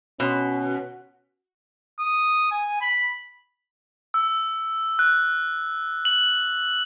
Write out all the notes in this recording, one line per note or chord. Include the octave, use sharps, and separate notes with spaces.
B2 C#4
D#6
G#5
B5
E6
F#6
F#7